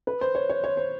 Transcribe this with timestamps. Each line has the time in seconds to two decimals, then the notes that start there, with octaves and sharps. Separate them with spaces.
0.07 B4
0.21 C5
0.35 C#5
0.50 C#5
0.64 C#5
0.77 C5